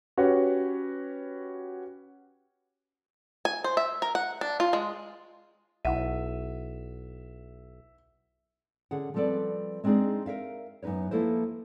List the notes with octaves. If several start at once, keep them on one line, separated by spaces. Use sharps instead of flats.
C#4 F#4 G4 B4 C#5
G#5
C5
E5
A#4
F#5
D4
F4
G#3
B1 E4 E5 F#5 D#7
D3 C#4 G#4 F#5
F3 G3 C4 A4 B4 D5
G#3 C4 D4 D#4 G#4
A#4 C#5 E5 F5
F#2 B3 D#4 B4 C#5
F3 A#3 E4 A4 B4 C5